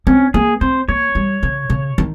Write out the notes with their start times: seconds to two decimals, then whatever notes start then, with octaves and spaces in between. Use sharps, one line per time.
0.07 C4 C#4
0.34 A#3 G#4
0.61 C4 C5
0.88 A#3 C#5
1.15 G3
1.43 C#3
1.70 C#3
1.98 D#3